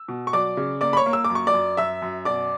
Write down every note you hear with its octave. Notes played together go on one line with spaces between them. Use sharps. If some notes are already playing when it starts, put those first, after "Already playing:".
Already playing: E6
B2
C#6
F#3 D5 D6
C#3
A#3 D5 D6
B5
C#5 C#6
A#3
E6
D6
F#2
C#6
D5 D6
F#2
F#2 E5 E6
F#2
B2 D5 D6